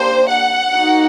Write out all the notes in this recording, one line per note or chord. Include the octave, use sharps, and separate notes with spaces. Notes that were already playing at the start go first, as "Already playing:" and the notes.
Already playing: A#3 D4 G4 C5
F#5
A#3 D#4 F#4